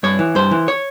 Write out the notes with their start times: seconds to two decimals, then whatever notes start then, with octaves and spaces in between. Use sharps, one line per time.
0.03 G2 C#5
0.19 E3
0.35 G2 C5
0.51 E3
0.68 C#5